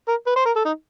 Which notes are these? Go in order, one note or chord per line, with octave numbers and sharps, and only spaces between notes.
A#4
B4
C5
A#4
A4
D#4